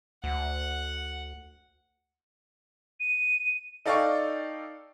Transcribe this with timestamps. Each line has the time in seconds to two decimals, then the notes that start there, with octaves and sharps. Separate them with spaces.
0.24 D2 F#5
3.00 D#7
3.86 D#4 A4 D5 F5 G5 C#6